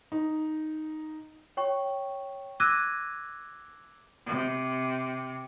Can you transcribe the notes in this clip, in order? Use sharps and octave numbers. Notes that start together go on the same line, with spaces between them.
D#4
C#5 G5 C#6
D6 E6 F#6 G#6 A#6 D#7
C3